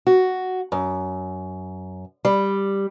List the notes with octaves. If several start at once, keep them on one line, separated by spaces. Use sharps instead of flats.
F#4
F#2
G3